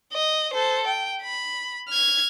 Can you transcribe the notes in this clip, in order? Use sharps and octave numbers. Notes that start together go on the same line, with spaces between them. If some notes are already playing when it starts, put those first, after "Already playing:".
D#5
A4 C5
G5
B5
F6 G#6